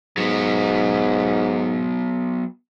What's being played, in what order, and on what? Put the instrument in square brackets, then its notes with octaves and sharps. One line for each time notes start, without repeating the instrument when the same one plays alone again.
[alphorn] G#2 [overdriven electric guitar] F#3 B3